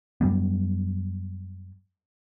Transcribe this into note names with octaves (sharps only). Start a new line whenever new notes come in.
F#2 F#3 G3 B3